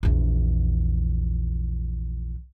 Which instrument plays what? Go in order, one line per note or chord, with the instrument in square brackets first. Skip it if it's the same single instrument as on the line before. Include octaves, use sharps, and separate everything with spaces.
[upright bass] A#1 E2